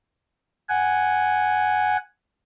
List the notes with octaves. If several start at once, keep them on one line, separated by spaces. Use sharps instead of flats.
F#5 G#5